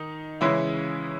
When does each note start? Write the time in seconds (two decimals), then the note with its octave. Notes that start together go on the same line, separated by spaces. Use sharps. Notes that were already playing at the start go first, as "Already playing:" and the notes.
Already playing: D#3 D#4
0.41 C#3 E3 G#3 C#4 E4